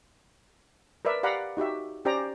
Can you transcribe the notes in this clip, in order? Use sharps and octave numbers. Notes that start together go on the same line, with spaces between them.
A#4 B4 D5 E5
G4 D5 F5 F#5 A#5 B5
D#4 F#4 G4 E5
C#4 G4 C5 D5 G5 A#5